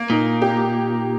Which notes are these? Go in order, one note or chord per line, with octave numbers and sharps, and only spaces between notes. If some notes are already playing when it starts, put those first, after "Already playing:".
Already playing: A#3
A#2 D#4
G4